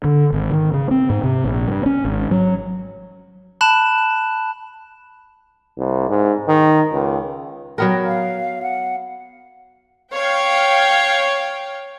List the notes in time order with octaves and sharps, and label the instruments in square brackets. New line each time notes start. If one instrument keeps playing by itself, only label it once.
[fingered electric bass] D3
G#1
D#3
C#3
C4
G#2
C3
A#1
G2
C#4
G#1
F#3
[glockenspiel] A5 B5 F#6 E7
[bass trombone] C2
G#2
D#3
C#2
[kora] F#3 B3 A#4 [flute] G5
[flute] F5
F#5
[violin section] C#5 F5 G5